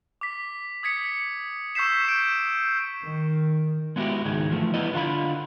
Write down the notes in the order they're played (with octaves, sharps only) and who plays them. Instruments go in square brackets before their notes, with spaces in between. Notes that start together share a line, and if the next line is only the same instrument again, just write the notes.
[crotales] D6 B6
D#6 G#6 B6 C#7
C#6 E6 G6 B6 C7 E7
G6 D7
[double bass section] D#3
[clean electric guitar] G#3 B3 D#4 E4 F#4 G4
C#2 G#2 D#3 G#4
E3 F3 A3
G3 B3 E4 D#5
D3 F4 F5 A#5 B5